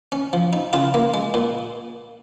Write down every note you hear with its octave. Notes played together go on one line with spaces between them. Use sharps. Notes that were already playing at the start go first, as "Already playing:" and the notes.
C#4
F3
D#4
C#3 F4
A#3
G#3
A#2